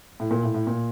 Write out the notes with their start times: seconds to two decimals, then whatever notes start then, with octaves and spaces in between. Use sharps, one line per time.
0.20 A2
0.31 A#2
0.43 A2
0.54 A2
0.67 A#2